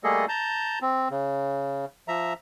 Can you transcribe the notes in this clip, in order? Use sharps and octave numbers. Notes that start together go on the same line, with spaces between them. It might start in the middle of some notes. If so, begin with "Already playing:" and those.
G3 A3 A#3 G#4 A4 D#5
A5 A#5 G6
C4
C#3
F3 E5 A#5